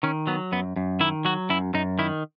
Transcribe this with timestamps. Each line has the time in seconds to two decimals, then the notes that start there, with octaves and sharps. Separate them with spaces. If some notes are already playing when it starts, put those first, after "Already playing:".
0.03 D#3 C#4
0.27 F#3 B3
0.52 F#2 B3
0.76 F#2
1.00 D#3 E4
1.25 F#3 F#4
1.50 F#2 E4
1.74 F#2 D#4
1.99 D#3 E4